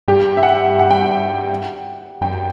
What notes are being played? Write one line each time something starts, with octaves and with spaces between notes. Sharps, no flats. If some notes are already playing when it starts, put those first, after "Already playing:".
G2 G4
E5
F#5
F#5
G5
F#5
F#2 G5